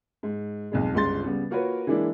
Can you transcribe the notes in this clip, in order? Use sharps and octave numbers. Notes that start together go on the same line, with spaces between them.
G#2
B1 F2 G#3
G1 C#2 G#3 C6 A6
C#3 G3 B3
A#3 F4 F#4 A#4 B4 C#5
E3 G#3 A#3 D4 E4